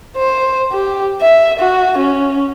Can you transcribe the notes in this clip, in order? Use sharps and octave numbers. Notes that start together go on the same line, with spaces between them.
C5
G4
E5
F#4
C#4